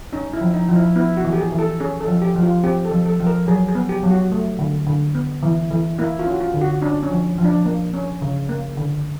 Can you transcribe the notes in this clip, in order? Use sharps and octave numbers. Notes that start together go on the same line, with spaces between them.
C#4 D#4
E4
F3
D#4
F3
E4
B3 E4
F#4
E3
G4
G#4
E3
A4
C#4 G#4
A4
F3
G4
F3
F4
C4 G4
A4
F3
A4
F3
A#4
F#3 G#4
G#4
B3
G4
F#3
F#4
A3
D3
D3
B3
E3
E3
A#3 E4
F4
C#4
F#4
F4
D3
F#4
C#4 D4
C#4
F3
F3
D4
A#3
C#4
C#3
A#3
D3